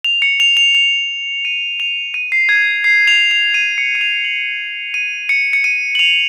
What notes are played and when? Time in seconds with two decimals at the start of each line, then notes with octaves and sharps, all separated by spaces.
0.04 F7
0.22 C#7
0.40 F7
0.57 F7
0.75 F7
1.45 D#7
1.80 F7
2.14 D#7
2.32 C7
2.49 G#6
2.84 C7
3.07 F7
3.31 F7
3.54 D#7
3.78 C#7
3.95 D#7
4.01 F7
4.25 F#7
4.94 D#7
5.29 C#7
5.53 C#7
5.64 D#7
5.95 F#7
5.99 F7